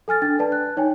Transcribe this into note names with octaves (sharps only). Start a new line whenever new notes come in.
A4 G#5 F6 A6
D4 G5 A6
B4 D5 A5
F#6
D#4 C#5 G5 G#5